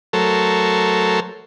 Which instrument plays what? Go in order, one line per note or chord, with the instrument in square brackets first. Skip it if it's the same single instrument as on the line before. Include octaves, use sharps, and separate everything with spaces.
[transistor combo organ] F#3 A3 A4 A#4 C5 C#5